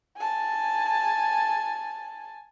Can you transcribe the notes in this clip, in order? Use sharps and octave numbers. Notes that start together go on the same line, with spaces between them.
G#5 A5